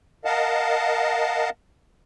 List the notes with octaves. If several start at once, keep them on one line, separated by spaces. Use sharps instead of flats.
A#4 D#5 F5 F#5 A5